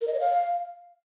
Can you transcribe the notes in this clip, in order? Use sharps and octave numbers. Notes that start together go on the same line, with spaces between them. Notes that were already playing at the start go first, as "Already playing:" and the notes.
A#4
D#5
C#5
F5